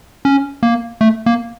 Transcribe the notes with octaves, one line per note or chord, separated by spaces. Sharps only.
C#4
A#3
A3
A#3